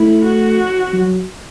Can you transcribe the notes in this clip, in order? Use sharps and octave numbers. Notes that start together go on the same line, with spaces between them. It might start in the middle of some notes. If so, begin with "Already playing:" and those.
Already playing: A3 E4
F#4
F#3